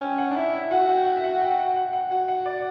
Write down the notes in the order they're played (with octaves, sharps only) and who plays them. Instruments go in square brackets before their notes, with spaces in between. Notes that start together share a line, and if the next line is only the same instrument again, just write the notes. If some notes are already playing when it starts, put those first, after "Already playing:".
[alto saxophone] C#4 [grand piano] G5
[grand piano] F#5
[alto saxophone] D4
[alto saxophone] E4 [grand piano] E5
[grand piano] E5
[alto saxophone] F#4 [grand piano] F#5
[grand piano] G5
F#5
E5
F#5
G5
F#5
F#5
F#5
[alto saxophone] F#4 [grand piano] F#5
[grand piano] F#5
D5